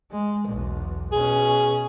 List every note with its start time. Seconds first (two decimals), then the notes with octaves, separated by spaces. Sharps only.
0.12 G#3
0.48 B1 E2
1.12 B2 C#4 G#4